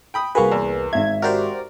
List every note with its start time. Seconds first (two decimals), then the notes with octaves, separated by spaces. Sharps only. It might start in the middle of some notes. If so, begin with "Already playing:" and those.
0.14 G5 B5 D#6
0.35 C2 A#3 F#4 G#4 B4 F5 C#6
0.52 E2
0.93 G#1 E5 G#6
1.22 F#4 G4 A#4 C5 D5